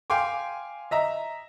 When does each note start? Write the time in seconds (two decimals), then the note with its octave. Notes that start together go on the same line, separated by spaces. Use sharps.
0.10 F5 G5 G#5 C6 D6
0.91 D#5 E5 A#5